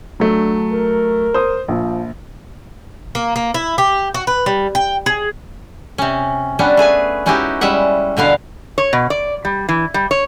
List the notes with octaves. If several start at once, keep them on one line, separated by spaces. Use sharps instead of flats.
F#3 A3 D4
A#4
C5 D#6
A#1 F3
A#3
A#3
E4
G4
F#4
B4
G3
G5
G#4
C3 C#4
G3 B3 C#4 D4
A3 G#4 B4 G#5
G#3 C#4 D#4 E4 F#4 G4
G3 G#3 C#4 E5 F#5
B2 D3 B3 F5
C#5
B2
D5
G3
E3
G3
C#5